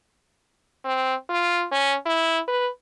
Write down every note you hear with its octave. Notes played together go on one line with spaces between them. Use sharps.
C4
F4
C#4
E4
B4